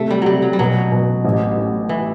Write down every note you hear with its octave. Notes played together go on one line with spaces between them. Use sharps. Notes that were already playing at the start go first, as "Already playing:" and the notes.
Already playing: C3 A3
G3
C3 F#3 G3
F#3
G3
B2 F#3
B2
A1
A2
E3